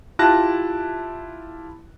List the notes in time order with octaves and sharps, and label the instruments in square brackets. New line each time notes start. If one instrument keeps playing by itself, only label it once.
[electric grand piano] E4 F4 G4 A5 F#6 A#6